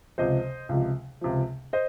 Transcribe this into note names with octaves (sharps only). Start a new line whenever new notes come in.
C#2 C3 F3 C5 D#5
C#2 C3 F3
C#2 C3 F3
C5 D#5